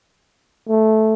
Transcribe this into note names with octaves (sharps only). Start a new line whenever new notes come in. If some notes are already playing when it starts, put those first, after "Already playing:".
A3